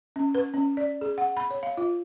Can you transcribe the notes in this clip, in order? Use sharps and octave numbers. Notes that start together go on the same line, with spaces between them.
C#4
B4
C#4
D5
G#4
F#5
B5
C#5
F5
F4